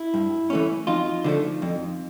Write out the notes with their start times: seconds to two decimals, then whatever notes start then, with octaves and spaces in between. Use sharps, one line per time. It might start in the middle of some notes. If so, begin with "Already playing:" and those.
Already playing: E4
0.14 G2
0.50 E3 A3 C#4
0.87 F2 D#4 F4
1.24 D3 F3 A3
1.62 F2